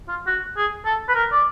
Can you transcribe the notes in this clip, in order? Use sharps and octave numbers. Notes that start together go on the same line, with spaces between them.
F4
F#4
G#4
A4
B4
A#4
D5